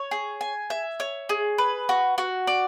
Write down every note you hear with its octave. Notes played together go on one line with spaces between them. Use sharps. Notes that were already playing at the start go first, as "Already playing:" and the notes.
Already playing: C#5
G#4
G#5
E5
C#5
G#4
B4
F#4
F#4
D5